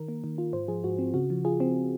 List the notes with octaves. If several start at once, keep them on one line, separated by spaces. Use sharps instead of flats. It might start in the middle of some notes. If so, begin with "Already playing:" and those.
Already playing: D#3 A#4
A#3
D#3
F4
G#2 C5
F3 G#4
G#2 F#4
C4
C#3 F#4
F3
F4 G#4
C4